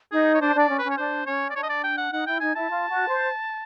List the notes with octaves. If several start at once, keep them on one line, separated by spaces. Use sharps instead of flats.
D#4 G#4
C#5
D4 C5
D4 D5
C#4
C#4 B4
C#5
D4 C5
C#4 C#5
D5
D4 C#5
D#5
D5
G5
F#5
D#4 F#5
E4 G5
D#4 G#5
E4 A5
F4
F#4
C5